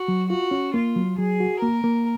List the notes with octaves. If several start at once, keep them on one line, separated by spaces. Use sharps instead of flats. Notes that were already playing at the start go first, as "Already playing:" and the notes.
Already playing: F#4
F#3
F4 F#4
C#4
A#3 F4
F#3
F#3 G#4
F#4
A#3 A#4
A#3